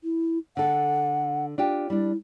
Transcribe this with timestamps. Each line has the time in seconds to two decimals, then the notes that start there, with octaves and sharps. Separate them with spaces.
0.04 E4
0.57 D3 A4 F#5
1.58 D4 F4 G4
1.90 G3 D4 E4